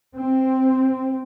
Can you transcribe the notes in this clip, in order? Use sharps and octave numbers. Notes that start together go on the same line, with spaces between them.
C4